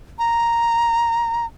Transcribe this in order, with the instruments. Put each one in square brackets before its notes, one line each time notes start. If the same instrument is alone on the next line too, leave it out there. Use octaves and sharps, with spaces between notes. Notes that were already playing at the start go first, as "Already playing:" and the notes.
[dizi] A#5